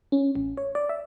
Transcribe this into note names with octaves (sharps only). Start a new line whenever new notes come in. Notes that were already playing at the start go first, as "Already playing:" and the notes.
C#4
A1
C#5
D5
E5